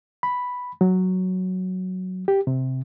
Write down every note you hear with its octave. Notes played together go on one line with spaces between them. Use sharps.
B5
F#3
G4
C3